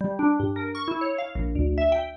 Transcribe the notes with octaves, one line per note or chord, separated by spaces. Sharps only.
G3
D4
G2
A#4
C#6
E4
C#5
F5
A#1
D2
E5
G5